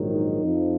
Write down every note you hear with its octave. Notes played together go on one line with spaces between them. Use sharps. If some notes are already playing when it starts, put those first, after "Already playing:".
Already playing: A#1 G#2 D#3 F#3
D#4
F2 F3